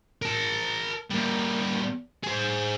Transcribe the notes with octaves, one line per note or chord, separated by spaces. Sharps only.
A#4 A5
G3 A#3
G#4 C5